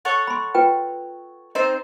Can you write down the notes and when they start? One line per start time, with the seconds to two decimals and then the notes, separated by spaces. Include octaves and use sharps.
0.05 A4 C#5 F#5
0.27 B5 C6
0.55 F4 B4 G5
1.55 C4 D#4 C5 D#5